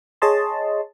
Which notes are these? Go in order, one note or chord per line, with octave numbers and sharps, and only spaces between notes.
G#4 C#5 D#5 A5 C6